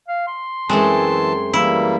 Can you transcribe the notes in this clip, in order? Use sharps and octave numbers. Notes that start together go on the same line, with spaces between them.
F5
C6
F#2 E3 G#3 A3 C4 A5
E3 G3 A#3 E4